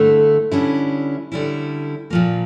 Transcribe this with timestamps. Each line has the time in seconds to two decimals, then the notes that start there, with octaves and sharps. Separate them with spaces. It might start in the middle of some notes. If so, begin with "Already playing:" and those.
Already playing: G2 D3 A3 E4
0.51 D3 G3 C#4 E4
1.32 D3 G3 C#4 E4
2.10 A#2 F3 A#3